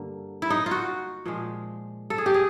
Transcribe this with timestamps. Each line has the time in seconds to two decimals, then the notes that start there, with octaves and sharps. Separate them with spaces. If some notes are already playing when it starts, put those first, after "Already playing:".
Already playing: G2 D3 A#3
0.42 E4
0.50 D#4
0.66 F4
0.71 F#4
1.26 A#2 F3 G#3
2.10 A4
2.18 G#4
2.26 G4
2.34 G#4